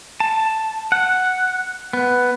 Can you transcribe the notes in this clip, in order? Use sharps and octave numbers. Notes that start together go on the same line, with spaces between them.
A5
F#5
B3